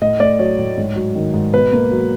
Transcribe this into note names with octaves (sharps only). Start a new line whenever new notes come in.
A2 D#5
A3 D5
F#3 C#5
A2
G#2
F#3
D#3
G#2
B2 B4
A#3
F#3